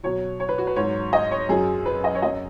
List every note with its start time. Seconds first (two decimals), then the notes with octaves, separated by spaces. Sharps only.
0.03 B2 F#3 C#5
0.40 C#5
0.49 B4
0.58 F#4
0.67 B4
0.76 G#2 F#3 C#5
1.13 D#5
1.31 C#5
1.49 F#2 F#3 G#4
1.86 B4
2.04 D#5
2.15 C#5
2.22 F#2 F#3 D#5